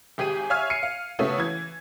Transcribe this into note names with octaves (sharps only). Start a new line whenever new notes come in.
G#1 G4 G#4 G#5 D#7
C#5 E5 F5 G#5 F6 G#6
F6 C7 C#7 D#7
F5
C#3 A3 B3 C#4 F#4 A4
E3 G#6